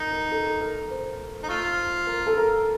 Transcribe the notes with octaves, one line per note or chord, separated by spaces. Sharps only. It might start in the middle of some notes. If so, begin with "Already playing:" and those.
Already playing: D#4 A#4
A#4
A4
A#4
C5
D#4
A3 F4
A#4
A4
A#4